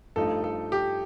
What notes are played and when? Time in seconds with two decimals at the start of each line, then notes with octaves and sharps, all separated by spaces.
0.16 G2 F3 A3 D#4 A4
0.44 A4
0.72 G4